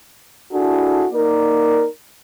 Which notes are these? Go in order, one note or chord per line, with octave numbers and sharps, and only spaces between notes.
D4 E4 F#4 G#4 A4
A#3 D#4 A#4 D5